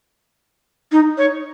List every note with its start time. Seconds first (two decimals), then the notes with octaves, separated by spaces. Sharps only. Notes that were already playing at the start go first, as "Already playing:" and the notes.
0.92 D#4
1.18 C#5